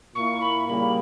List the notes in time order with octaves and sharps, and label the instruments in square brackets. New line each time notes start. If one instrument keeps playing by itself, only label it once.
[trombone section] A#2 A#3 E4 [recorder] C#6
[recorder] B5
[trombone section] C#3 G3 A#3 [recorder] B5